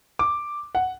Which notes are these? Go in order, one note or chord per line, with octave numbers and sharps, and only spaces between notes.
D6
F#5